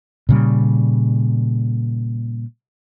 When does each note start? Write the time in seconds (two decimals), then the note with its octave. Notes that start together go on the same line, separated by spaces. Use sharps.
0.29 A#2 C#3 G3